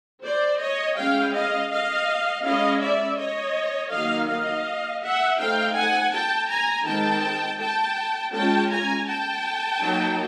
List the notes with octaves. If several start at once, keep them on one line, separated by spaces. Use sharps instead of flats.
C5 D5
C#5 D#5
G#3 C#4 E4 F5 G5
D#5 F5
D#5 F5
G#3 C#4 E4 D#5 F5
D5 E5
C#5 D#5
D#3 F#3 A#3 D#4 D#5 F5
D#5 F5
E5 F#5
A3 C4 D#4 F5 G5
F#5 G#5
G5 A5
G#5 A#5
D#3 G#3 C4 G5 A5
G5 A5
G#3 C#4 F4 G5 A5
G#5 A#5
G5 A5
F#3 A#3 D#4